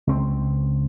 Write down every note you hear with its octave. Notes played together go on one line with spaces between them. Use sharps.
C#2 C4